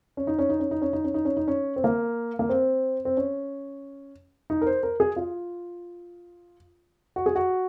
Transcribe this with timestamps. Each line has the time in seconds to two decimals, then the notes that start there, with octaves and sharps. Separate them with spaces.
0.17 C#4
0.27 D#4
0.39 C#4
0.49 D#4
0.60 C#4
0.71 D#4
0.82 C#4
0.93 D#4
1.04 C#4
1.14 D#4
1.25 C#4
1.37 D#4
1.48 C#4
1.76 C4
1.84 A#3
2.39 A#3
2.49 C4
3.05 C4
3.17 C#4
4.50 D#4
4.61 A#4
4.67 C5
4.83 A#4
5.00 G#4
5.16 F4
7.16 F#4
7.26 G#4
7.36 F#4